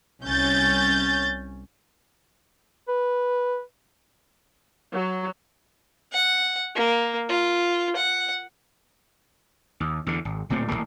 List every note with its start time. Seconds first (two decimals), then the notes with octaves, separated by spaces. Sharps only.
0.23 C2 C#4 G6 A6
2.88 B4
4.91 F#3
6.12 F#5
6.75 A#3
7.29 F4
7.96 F#5
9.80 D#2
10.07 E2 D3
10.25 G#1
10.50 D1 A#2 A3 C4
10.69 G#1 E2 A2 A#3